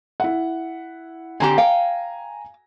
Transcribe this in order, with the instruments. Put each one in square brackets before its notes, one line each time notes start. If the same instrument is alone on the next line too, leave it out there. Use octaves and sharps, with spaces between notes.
[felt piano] E4 F#5
[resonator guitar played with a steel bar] D3 C4 G4 [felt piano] G#5 A#5
[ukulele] F5 [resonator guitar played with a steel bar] G5